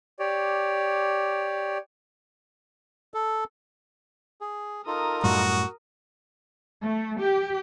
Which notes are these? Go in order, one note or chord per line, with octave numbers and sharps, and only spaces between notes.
G4 C#5 D5
A4
G#4
D#4 F4 A4 A#4 D#6
F#2 A2 G3 F#4
A3
G4